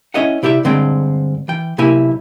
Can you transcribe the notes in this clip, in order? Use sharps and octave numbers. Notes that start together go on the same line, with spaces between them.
C#4 E4 C#5 D#5 E5 F#5
C3 E4 G4 D5 E5
G2 D3 G#3 C4 D5 G5
E3 G5
B1 C3 A#3 E4 G4 G#5